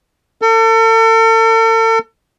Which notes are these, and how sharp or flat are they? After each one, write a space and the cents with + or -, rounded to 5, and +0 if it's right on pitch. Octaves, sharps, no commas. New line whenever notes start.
A4 +40